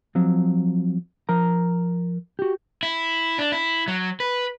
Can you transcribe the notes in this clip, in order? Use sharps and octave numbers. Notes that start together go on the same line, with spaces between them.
F3 F#3 C4
F3 A#4 A#5
F#4 G4
E4
D4
E4
F#3
B4